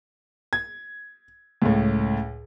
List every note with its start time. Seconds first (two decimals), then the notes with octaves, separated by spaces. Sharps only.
0.53 G#6
1.62 C#2 A2